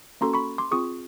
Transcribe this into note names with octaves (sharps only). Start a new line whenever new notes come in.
A#3 C#4 F#4 A4 A#5 C6
B5 C#6
C6 D6
C4 F4 G#4 C#6 D#6